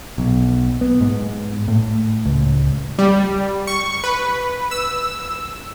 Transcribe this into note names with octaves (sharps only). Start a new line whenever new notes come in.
B1
B3
G#2
A2
C#2
G3
C#6
B4
E6